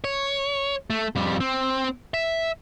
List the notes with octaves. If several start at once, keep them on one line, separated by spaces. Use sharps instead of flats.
C#5
A3
F2 G3
C4
E5